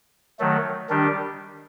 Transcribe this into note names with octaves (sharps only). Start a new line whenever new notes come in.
D#3 F#3 A3
D#3 G3 D4 G4